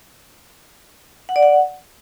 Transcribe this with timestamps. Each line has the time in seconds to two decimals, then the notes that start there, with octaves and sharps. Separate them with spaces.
1.29 F#5
1.36 D5
1.43 F#5